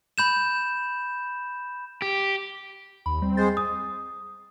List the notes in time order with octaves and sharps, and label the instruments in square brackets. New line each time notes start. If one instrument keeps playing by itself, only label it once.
[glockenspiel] B5 G6 E7
[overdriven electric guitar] G4
[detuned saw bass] D#2 [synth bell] B5
[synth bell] G3 [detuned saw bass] C4
[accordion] G#3 C5 [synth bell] A6
[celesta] D#6